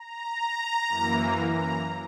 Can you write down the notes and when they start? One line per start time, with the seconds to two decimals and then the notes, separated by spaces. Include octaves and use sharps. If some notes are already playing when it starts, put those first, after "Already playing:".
Already playing: A#5
0.88 F#2 E3 A#3
1.52 A#5